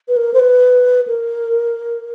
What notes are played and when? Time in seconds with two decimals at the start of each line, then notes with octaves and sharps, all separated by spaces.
0.08 B4
0.17 A#4
0.34 C5
0.39 B4
1.07 A#4